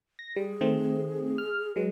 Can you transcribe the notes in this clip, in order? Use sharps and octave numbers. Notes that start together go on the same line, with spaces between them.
A#6
G3 G#4
D#3 A3 C4
F6
F#3 G#3 B4